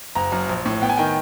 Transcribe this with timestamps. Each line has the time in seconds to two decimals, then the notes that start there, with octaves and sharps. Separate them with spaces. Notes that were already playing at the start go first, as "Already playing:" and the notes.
0.15 F#1 A#5
0.32 F#2
0.49 A#1
0.65 A2
0.82 B3 G5
0.89 G#5
0.97 D#3 G5